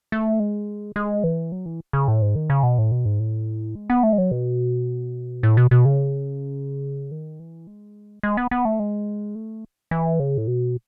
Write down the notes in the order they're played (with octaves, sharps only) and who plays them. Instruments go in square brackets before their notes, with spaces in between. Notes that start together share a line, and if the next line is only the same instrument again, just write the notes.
[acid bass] A3
G#3
G#3
E3
F#3
E3
C#3
A2
G#2
D#3
C#3
B2
A2
B2
G#2
A2
G#3
B3
A3
G#3
F#3
B2
A2
B2
B2
C#3
D#3
E3
G#3
G#3
B3
B3
A3
G#3
A3
E3
C#3
A2
B2